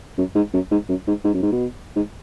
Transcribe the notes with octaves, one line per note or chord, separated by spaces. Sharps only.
F#2
G#2
F#2
G#2
F#2
G#2
G#2
F#2
G#2
B2
G#2